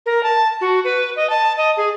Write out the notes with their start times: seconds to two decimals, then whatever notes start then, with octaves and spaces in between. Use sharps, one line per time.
0.06 A#4
0.23 A5
0.61 F#4
0.84 B4
1.16 D#5
1.30 A5
1.57 D#5
1.77 G#4